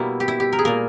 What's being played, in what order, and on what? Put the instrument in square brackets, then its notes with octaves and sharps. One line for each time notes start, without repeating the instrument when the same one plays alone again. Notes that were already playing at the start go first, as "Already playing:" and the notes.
Already playing: [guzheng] B2 G3 A#3 E4
G4
E4
G4
A#4
G#4
A#2 A#3 A#4